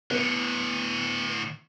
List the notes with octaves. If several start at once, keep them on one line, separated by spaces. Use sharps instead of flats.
A2 D3 B3